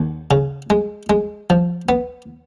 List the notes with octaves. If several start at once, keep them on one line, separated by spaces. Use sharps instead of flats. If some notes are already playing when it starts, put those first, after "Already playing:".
Already playing: D#2
C#3
G#3
G#3
F3
B3